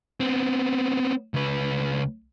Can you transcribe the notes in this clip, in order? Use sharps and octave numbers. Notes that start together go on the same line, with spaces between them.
B3 C4
C#2 B4